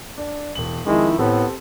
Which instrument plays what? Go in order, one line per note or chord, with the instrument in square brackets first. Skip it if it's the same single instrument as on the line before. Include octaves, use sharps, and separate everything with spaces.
[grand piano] D4
E1 F#7
[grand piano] F2 D#3 [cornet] G#3 [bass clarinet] E4
[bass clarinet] A2 [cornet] B3 [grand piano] C4 G4 A4